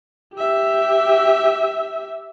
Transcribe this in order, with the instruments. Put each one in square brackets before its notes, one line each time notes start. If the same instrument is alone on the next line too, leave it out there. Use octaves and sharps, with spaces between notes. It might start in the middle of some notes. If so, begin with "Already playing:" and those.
[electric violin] G4 E5